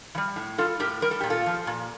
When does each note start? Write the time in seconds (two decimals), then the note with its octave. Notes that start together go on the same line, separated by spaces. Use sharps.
0.15 E3
0.18 G3
0.36 A2
0.58 G3 F4 A4
0.80 A2 G4 A#4
1.02 G3 A#4
1.11 A4
1.21 A#2 G4
1.30 F4 A4
1.46 F3
1.67 A#2